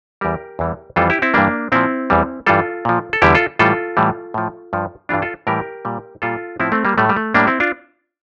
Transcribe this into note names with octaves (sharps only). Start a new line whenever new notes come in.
E2 E3 G3 G4 A#4
E2 E3 G3
F2 E3 G3 F4 A4
E4 G4
C4 E4
G2 E3 G3 A#3 D4
A#2 F3 C4 E4
E2 E3 G3
G2 E3 G3 F4 A4
A#2 F3
A4
E2 D3 G3 E4 G4
F4 A4
A2 E3 G3 F4 A4
A2 E3 G3
A2 F3
G2 F3
G2 E3 G3 D4 F4
F4 A4
A2 E3 G3 G4 A#4
A#2 G3
A#2 G3 F4 A4
A2 F3 C4 E4
A3 C4
G3 A#3
A2 G3 A3
G3
A3
A2 G3 A#3 D4
C4 E4
D4 F4